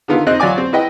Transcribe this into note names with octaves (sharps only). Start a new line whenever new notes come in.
D3 D#3 B3 F4
C4 D#4 D#5 F#6
F#3 F4 D5 G#5 D6
C4
E4 B4 D#5 G5